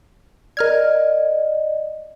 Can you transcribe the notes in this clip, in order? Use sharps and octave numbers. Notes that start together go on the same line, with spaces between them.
A#4 D5 D#5 F6 G#6